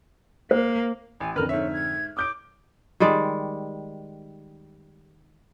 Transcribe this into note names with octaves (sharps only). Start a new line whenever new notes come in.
A#3 C5
A1 G#5
F2 D3 A#4 B4 F6
G#2 C#5 E5
G#6
D6 D#6 G6 D7
D#3 G3 G#3 D5